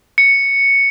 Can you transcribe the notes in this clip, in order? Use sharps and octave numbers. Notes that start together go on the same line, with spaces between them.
C#7